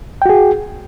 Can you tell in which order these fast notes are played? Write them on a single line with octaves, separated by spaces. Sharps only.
G5 F#4 G#4